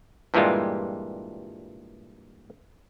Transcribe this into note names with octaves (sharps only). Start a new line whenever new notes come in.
G2 A#2 E3 G3 G#3 F4